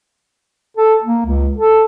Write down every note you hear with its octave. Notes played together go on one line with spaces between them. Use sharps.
A4
A#3
C#2
A4